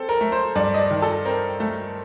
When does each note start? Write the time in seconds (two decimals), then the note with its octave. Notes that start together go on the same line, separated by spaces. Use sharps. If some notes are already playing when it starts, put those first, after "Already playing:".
Already playing: C4 A4
0.09 A#4
0.21 A3
0.32 C5
0.55 G2 D5
0.74 D#5
0.78 D5
0.90 D#3
1.02 A4
1.25 C4 A#4
1.60 A3